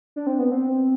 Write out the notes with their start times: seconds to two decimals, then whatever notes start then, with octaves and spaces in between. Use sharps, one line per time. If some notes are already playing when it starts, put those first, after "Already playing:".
0.16 D4
0.27 C4
0.39 B3
0.51 C4